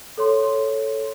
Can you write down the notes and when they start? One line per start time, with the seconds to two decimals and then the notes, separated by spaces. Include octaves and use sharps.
0.18 A4 C#5 C6